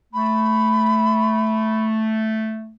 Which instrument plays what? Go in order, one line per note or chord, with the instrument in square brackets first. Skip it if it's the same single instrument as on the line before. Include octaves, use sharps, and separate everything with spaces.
[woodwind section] A3 [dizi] B5